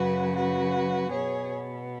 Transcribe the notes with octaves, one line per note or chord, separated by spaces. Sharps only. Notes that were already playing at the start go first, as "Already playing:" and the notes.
Already playing: F#2 C#3 F#3 F#4 B4
F#4 B4
B2 B3 G#4 C#5